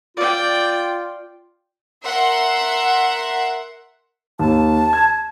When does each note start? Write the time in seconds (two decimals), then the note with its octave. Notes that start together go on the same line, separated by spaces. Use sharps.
0.17 F4 D5 G5
2.04 A#4 E5 F#5 C6
4.39 D#2 A5
4.93 G#6